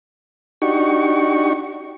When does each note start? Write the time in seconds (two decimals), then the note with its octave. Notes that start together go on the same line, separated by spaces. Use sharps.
0.62 D4 D#4 F#4 G4 C#6